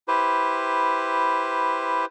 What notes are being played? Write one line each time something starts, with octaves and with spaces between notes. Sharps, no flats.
E4 G4 B4 C5